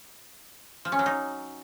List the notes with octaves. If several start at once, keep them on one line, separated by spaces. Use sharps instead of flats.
F3
C#4
F#3
D#4